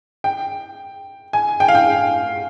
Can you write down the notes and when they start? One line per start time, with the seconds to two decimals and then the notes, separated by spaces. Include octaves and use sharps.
0.24 G5
1.33 G#5
1.60 G5
1.68 F5
1.75 G5